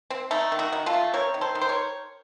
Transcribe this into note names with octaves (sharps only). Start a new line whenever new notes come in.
C4
A3 D#4
D#3
D#4 F#4
D#3
F4 A4
A3
C4 A#4 C#5
D#3
A4 C5
D#3
C5
A#4 C#5